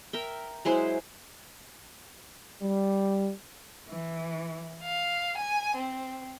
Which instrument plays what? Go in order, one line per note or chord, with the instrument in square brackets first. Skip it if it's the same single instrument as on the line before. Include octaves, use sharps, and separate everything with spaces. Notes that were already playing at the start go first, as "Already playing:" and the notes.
[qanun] A#4 E5 G5
F#3 G#3 E4 C5
[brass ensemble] G3
[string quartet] E3
F5
G#5
C4